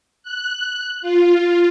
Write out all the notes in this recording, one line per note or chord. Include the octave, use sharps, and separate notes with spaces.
F#6
F4